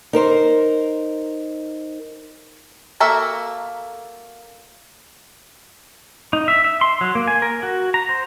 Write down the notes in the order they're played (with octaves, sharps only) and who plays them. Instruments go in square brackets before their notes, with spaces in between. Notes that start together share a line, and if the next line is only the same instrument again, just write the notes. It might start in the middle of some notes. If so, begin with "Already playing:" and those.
[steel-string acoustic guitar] D#4 A#4 C5
[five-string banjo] A#3 F#4 A4 A#4 E5
[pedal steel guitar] D#4
E5
E5
C6
F#3
A#3
G#5
A#4
F#4
A#5
C5